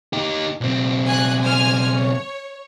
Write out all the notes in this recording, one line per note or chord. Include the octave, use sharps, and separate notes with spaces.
D#4 G4
B1 C4
G#5 F#6
C5 G#5 F6
C#5